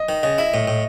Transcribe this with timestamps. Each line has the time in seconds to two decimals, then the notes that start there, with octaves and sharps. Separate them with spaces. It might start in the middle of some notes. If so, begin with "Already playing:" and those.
Already playing: D#5
0.09 D#3
0.23 C#3 D#5
0.38 E4 E5
0.54 A2 D#5
0.68 A2